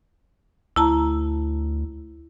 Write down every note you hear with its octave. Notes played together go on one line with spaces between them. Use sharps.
D2 E4 A5 A#5